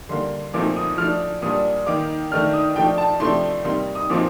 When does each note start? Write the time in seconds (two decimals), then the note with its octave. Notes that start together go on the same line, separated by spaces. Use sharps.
0.09 D3 G3 A#3 C6
0.54 A#2 F3 A3 C4 D#4 D6
0.76 D#6
0.98 F3 A3 D4 F6
1.42 A#2 G3 D4 D#6
1.86 D#3 A#3 D#4 D6
2.31 D#3 A3 D4 F6
2.53 D#6
2.76 F3 A3 D4 G5
2.98 A5
3.20 C3 F3 A3 D4 C6
3.65 C3 G3 A#3 D#4 C6
3.95 D#6
4.10 A#2 F3 C4 D#4 D6